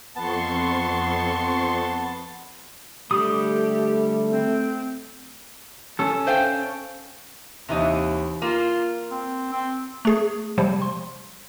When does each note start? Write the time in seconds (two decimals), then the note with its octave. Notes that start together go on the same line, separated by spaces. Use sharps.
0.16 F2 B3 A5 C6 C#6
3.11 D3 G3 A3 G4 D#6
4.31 C4
5.99 C#4 A4
6.27 C5 F5 G5
7.69 D#2 C3 E3 D#4
8.42 A#3 F4
9.11 C4
9.52 C4
10.05 A3 G#4
10.58 C3 F3 G3 C5
10.82 C6